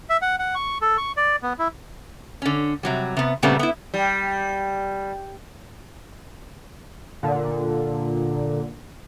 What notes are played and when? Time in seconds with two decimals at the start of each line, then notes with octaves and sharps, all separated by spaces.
0.10 E5
0.22 F#5
0.39 F#5
0.55 C#6
0.81 A4
0.97 C#6
1.17 D5
1.42 B3
1.59 E4
2.42 D3 C#4
2.83 C3 F#3 G3
3.17 C3 B3
3.43 A#2 C#3 G3 A3 B3 C4
3.59 B3 E4
3.94 G3
7.23 A#2 D3